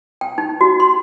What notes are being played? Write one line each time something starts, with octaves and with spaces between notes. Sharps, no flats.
G5
D#4
F#4
C6